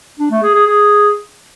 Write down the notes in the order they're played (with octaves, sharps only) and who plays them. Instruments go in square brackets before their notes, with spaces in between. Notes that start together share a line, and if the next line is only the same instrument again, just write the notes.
[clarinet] D4
A3
G#4
G#4
G#4